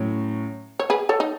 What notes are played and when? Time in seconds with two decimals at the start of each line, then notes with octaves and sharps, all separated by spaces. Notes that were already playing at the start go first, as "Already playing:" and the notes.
Already playing: A2 F#3 C#4
0.79 C#5
0.90 G#4 B4
1.09 A4 C#5
1.20 D#4